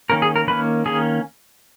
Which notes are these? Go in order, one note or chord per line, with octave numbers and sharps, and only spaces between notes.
D#3 A#3 C#4 A#4
G#4
A#4
D#3 A#3 C#4 B4
D#3 A#3 C#4 G#4